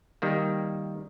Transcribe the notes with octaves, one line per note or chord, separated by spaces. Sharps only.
D#3 G3 A#3